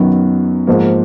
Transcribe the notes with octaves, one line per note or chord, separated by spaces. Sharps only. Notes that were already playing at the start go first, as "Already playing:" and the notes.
Already playing: F#2 D#3 F#3 B3
G#2 F3 A#3